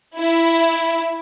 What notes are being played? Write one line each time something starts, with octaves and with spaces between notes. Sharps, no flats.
E4